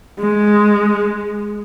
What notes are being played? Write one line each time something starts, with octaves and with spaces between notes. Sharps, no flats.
G#3